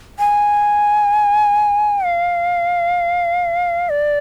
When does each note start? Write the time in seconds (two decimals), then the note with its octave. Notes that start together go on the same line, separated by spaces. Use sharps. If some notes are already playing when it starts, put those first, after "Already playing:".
0.19 G#5
2.04 F5
3.90 D5